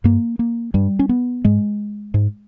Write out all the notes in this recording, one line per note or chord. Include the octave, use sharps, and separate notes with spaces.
G2 A#3
A#3
G2 G3
C#4
B3
G#2 G#3
G#2